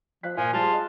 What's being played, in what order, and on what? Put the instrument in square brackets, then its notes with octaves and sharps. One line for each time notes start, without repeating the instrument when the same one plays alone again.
[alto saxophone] F3 [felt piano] F5 F#6 B6
[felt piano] A#2 [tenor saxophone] F3 [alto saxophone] G#5
[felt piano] G3 G#4 [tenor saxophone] F4 [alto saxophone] A5
[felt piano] D#5